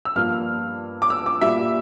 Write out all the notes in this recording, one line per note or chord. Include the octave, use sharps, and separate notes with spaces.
E6
G2 F3 A#3 F6
D6
E6
D6
A#2 G3 A#3 E5